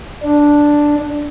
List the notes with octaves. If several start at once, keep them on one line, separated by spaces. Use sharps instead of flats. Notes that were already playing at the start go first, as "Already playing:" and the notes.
D4